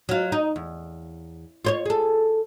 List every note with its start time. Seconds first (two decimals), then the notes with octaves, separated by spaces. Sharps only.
0.09 F#3 F4
0.32 D#4
0.56 E2
1.65 F4 C5 C#5
1.86 G#4 A4